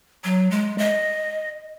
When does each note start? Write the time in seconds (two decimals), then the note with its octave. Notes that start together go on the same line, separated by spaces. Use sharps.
0.24 F#3
0.51 G#3
0.78 D#5